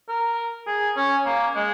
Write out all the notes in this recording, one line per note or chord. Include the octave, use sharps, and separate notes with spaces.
A#4
G#4
C#4
A#3
G#3